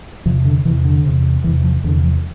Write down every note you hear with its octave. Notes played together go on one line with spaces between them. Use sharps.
E2 C3 F3
D3
E2 C3 E3
D3
E2 C3
E2 C3 E3
F3
E2 C3 D3
F3